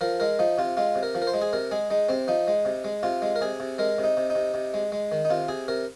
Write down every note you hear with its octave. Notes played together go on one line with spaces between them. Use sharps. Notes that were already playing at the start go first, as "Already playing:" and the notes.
F3 A#4
G#3 A#4
F3 D#4
C3 F4
G#3 F4
C3
A#4
F3
A#4
C5
G#3
G#4
C3 A#4
G#3 G#4
G#3 D#4
C3 C4
F3 D#4
G#3
C3
G#3
C3 F4
G#3
A#4
C3 G#4
C3
G#3 A#4
C3
D#4
C3
D#4
C3
C3
G#3
G#3
D#3
D#4
C3 F4
C3 G#4
C3 A#4